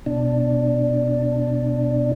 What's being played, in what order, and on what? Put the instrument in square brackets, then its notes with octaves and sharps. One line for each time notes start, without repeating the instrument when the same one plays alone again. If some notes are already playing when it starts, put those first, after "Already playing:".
[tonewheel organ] B2 D4